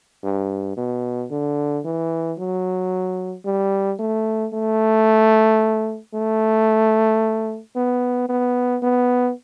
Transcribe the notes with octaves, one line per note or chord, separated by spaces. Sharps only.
G2
B2
D3
E3
F#3
G3
A3
A3
A3
B3
B3
B3